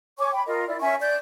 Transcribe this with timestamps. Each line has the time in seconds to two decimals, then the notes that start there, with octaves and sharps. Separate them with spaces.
0.18 C#5 G#5 C#6 D6
0.33 G5 B5
0.47 F4 A#4 D#5
0.68 E4 D5
0.81 C#4 E5 G#5 C#6
1.00 D5 G6